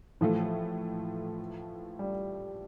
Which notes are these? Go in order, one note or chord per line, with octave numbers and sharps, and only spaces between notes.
A2 E3 F3 A3
G3